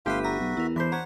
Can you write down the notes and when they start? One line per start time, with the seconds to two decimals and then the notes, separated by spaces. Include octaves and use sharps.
0.06 G1 A3 G4 B4 E5 F5 C6 F#6
0.23 F#4 E5 A#5 D#7
0.40 B1
0.57 E2 E4 A#4
0.76 E3 D4 C5 C6 B6
0.92 C#5 F#5 A#5 C7